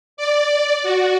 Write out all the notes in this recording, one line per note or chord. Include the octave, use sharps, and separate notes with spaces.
D5
F#4